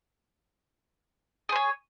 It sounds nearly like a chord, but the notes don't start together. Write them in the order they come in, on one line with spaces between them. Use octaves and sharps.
G#4 C5 C#5